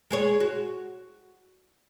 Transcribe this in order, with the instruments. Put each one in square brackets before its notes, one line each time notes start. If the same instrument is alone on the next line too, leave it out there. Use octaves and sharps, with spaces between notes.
[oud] G#3 G#4 C#5
F#4